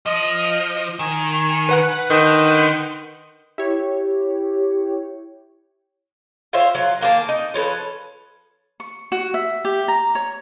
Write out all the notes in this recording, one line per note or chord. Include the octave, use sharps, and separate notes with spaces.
F3 D#5
D#3 G#5
B4 F#5 F#6
D3 D#3 G6
E4 G4 C#5
F4 C5 C#5 E5
F#3 F4
D#3 A#3 G#4 A5
D#4
F3 C#4 A4 B4
C#6
F#4
E5
G4
A#5
C#5